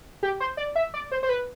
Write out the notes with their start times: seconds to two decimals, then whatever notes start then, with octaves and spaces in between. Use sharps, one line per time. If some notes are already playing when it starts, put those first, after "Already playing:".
0.23 G4
0.40 C5
0.57 D5
0.76 E5
0.94 D5
1.12 C5
1.23 C5
1.29 B4